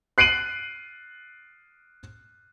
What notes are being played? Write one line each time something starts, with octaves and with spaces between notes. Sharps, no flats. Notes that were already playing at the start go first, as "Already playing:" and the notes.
F#6 C7 D7 D#7 F#7